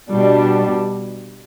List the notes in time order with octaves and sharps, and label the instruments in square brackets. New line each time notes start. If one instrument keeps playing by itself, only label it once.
[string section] B2 G3 D4